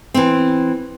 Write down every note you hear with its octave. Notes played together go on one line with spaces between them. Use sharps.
E3 C4